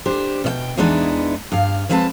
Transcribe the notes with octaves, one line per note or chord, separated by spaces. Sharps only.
D4 G4 C5
B2 D5 G5
E2 E3 G#3 B3 D4 D#4
G2 F5
F3 G#3 C4 B4 F5 A5